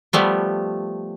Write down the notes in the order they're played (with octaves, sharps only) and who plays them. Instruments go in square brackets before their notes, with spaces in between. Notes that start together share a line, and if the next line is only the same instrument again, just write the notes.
[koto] F3 G3 A3 B3